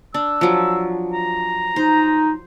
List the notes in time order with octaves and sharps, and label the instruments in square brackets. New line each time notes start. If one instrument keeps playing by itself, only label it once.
[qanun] D4 [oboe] E6
[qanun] F3 F#3
[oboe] A#5
[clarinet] D#4 [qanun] C5